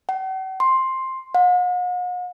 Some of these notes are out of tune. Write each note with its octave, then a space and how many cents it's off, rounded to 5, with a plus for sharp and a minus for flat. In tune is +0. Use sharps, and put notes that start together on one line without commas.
F#5 +45
C6 +10
F#5 -45